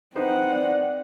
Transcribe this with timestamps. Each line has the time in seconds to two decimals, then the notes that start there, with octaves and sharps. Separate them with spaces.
0.15 C4 D#4 B4 C5 F#5
0.52 D5